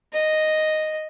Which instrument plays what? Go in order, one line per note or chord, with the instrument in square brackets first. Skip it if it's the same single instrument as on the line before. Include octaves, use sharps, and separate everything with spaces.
[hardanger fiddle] D#5